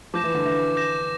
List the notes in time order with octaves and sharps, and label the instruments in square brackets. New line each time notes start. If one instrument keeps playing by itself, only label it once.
[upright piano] F3 [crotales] D6 G6 A#6 E7
[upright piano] E3
D3
[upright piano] E3 [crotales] D6 G6 A#6 E7
[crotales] D6 G6 A#6 E7